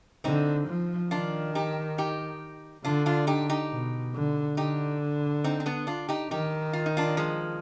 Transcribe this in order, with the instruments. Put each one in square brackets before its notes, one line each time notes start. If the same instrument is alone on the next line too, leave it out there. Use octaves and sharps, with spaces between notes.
[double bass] D3 [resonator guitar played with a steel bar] C4 D#4
[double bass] F3
[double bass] D#3 [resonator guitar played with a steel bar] D4 F4
[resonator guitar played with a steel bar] D#4 G4
D#4 G4
[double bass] D3 [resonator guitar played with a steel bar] D4 F4
[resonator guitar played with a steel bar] D4 F4
D#4 G4
D#4 G4
[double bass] B2
D3
[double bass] D3 [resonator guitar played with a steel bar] D#4 G4
[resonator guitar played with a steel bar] C4 D#4
C4
B3 D4
D4 F4
D#4 G4
[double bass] D#3 [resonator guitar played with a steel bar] D#4 G4
[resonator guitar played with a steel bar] F4
D#4
D4 F4
F3 G#3